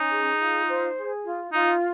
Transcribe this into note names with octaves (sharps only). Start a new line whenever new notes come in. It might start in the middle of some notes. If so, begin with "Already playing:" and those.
Already playing: C#4 D#4
G#4
F4
C5
G#4
F4
D#4 F4